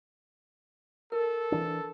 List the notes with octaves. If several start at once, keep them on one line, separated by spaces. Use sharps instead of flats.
A4 A#4
E3 D4